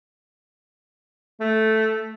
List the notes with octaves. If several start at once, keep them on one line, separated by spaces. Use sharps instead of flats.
A3